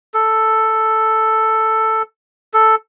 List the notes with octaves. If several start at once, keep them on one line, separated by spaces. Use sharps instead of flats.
A4
A4